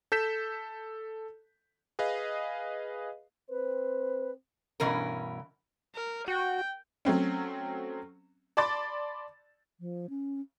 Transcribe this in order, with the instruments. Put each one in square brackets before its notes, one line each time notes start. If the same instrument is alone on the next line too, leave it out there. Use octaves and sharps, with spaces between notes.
[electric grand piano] A4 G6 B6 E7
G#4 B4 D#5 F5
[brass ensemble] C4 C5 [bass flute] B4
[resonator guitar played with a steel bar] G2 B2 E3 C#4 A#4
[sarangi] A#4
[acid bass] F#4 [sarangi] G5
[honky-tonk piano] F#3 A3 C4 C#4
D5 A5 B5 C6 D6 A6
[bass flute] F3
C#4